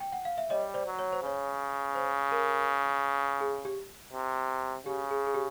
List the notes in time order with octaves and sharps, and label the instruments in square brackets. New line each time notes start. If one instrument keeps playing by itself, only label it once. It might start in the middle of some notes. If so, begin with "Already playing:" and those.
[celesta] G5
F#5
F5
E5
[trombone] G3 [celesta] C#5 D#5
[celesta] C5 D5
[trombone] F#3
[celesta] C#5
C5
[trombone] C#3 [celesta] C#5
[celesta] C5
A#4
G#4
G4
[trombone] C3
[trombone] C#3 [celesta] G4
[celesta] G#4
G#4
G4